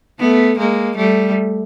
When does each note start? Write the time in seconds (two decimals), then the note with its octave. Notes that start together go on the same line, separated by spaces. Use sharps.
0.19 A3 B3
0.58 G#3 A#3
0.97 G3 A3